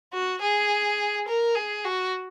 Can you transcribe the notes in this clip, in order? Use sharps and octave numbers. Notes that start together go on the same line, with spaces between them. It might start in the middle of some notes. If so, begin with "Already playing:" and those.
F#4
G#4
A#4
G#4
F#4